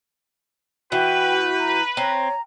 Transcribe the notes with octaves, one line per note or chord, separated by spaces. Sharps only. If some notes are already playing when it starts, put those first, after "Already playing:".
E3 F#4 B4 G5 G6
A#5
C4 C#5 A#5